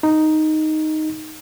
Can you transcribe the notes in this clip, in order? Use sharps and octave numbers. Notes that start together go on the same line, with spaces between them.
D#4